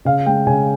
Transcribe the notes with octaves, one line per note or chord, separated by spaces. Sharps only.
C#3 F5
G#3 G5
C#3 G#5